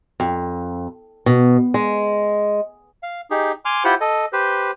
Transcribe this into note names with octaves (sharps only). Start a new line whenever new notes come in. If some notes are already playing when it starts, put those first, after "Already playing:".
F2
B2
G#3
F5
D#4 G4 G#4
G#5 C6 D6 F6
E4 F4 G4 C5 F#5
A4 D#5
G4 B4 C5